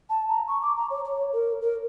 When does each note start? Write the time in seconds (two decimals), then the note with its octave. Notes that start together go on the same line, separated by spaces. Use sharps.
0.10 A5
0.29 A#5
0.48 C#6
0.62 D6
0.77 A#5
0.90 C#5
1.05 C#5
1.33 A#4
1.61 A#4